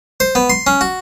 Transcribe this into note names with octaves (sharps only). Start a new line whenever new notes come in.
C5
B3
C6
C#4
F#4